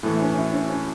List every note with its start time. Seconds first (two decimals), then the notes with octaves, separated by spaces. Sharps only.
0.03 A2 E3 A3 B3
0.14 E4
0.20 C#4
0.30 C#4
0.35 E4
0.51 C#4
0.68 C#4